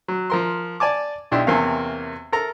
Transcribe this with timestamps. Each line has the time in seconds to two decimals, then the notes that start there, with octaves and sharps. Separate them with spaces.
0.08 F#3
0.30 F3 A#4 C6
0.80 D5 G#5 A5 D6
1.32 B1 D4 E4 G4 C6
1.47 E2 C3 A#3 C4 C#4 F5
2.32 A4 A#4 A#5